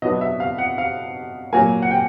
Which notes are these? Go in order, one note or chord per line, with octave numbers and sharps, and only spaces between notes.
B2 F#3 B3 D4 D#5
E5
F5
F#5
F5
A#2 F#3 A#3 G#5
F#5
G5